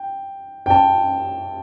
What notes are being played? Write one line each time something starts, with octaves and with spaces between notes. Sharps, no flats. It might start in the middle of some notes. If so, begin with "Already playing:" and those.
Already playing: G5
G5
A5